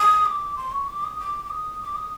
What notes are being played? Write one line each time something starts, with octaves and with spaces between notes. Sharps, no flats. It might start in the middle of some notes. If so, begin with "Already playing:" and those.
Already playing: D#6
D6
C6
C#6
D6
D#6
D6
D6
D#6
D6
D#6